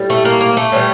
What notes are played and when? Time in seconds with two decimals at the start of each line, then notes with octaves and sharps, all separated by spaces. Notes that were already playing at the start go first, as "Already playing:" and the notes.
Already playing: A2 G3
0.10 A3
0.25 A#3
0.41 A#3
0.57 A3
0.72 A2 E3 G3